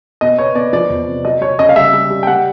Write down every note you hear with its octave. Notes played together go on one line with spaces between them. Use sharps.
B2 D#5
B3 C#5
B3 D5
F3 D5
E2
C3
F#3 D#5
F#3 C#5
C#3 D#5
F5
G3 E5
G3
G3
G5
G3 F#5